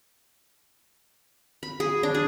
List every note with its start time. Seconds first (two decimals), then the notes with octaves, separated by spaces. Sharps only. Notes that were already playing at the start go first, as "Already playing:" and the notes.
1.63 B5
1.80 G#4
2.03 D4
2.15 G#4